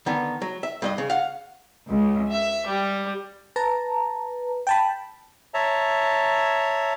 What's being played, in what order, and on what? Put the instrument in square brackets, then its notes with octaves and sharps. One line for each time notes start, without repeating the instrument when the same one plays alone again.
[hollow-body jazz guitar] D3 D#3 B3
F#3
E5
G2 A4 D#5
C#3
F5 F#5
[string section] C#2
E5
G3
[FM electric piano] B4 A5 A#5
G5 A5 B5
[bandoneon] C#5 E5 A5 A#5